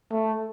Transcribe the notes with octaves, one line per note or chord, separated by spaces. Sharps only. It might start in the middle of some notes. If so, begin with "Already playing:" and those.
A3